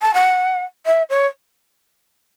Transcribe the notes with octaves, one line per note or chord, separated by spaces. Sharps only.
A5
F#5
E5
C#5